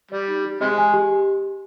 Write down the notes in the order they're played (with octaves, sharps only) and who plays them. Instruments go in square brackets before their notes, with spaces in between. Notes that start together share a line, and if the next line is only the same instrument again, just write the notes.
[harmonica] G3 [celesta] D5
[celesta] D#4
G4
[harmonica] C3 G#3 [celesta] D#5
[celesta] G#5
G4